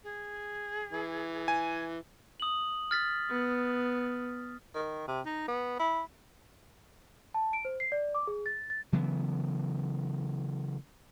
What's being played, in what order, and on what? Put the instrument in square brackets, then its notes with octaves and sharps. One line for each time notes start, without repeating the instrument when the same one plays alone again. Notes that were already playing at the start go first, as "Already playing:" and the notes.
[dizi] G#4
[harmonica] E3
[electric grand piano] G#5
[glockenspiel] D#6 F#7
F6 A6 B6
[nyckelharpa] B3
[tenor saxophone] D#3
C3
D#4
B3
E4
[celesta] A5
D7
C5
C7
D5
D6
G#4
A6
A6
[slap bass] C#3 E3 F#3 B3